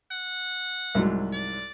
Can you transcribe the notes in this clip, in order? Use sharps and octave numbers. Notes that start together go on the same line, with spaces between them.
F#5
C2 G#2 F#3
D5